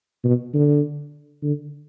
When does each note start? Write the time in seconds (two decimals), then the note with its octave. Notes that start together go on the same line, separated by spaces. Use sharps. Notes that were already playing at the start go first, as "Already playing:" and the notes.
0.24 B2
0.54 D3
1.42 D3